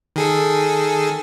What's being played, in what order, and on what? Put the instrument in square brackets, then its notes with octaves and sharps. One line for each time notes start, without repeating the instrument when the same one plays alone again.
[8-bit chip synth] D#3 G#4 A4